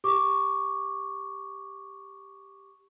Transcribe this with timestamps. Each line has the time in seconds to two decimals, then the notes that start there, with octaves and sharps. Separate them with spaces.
0.04 G4 C#6 D6